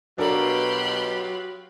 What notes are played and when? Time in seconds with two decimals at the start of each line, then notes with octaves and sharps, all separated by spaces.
0.18 B2 F#3 D4 F4 G4 A4 A#4 B5